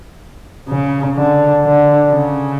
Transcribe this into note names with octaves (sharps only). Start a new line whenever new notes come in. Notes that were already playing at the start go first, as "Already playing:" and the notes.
C#3
D3
D3
C#3